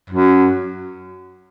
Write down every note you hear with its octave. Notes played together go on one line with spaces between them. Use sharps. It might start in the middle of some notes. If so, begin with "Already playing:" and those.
F#2